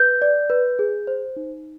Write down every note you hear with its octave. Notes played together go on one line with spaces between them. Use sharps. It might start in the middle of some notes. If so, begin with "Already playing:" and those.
Already playing: B4 G6
D5
B4
G#4
C5
D#4